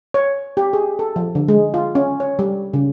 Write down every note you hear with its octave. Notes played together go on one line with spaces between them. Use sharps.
C#5
G4
G#4
A4
F3
D3
G#3
F4
C#4
C#5
G3
C#3